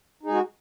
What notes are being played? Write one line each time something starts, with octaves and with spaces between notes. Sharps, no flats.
G#3 D#4 F#4 G#4